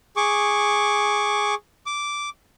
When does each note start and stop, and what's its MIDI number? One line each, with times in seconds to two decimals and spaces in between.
0.16 1.55 68
0.16 1.55 85
0.16 1.55 86
1.86 2.29 86